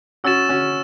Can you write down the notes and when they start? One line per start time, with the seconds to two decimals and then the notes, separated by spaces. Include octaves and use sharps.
0.24 C#4 F#4 E6 A6 E7
0.49 C#4 F#4